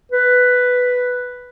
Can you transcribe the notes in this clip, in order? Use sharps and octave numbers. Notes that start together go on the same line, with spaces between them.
B4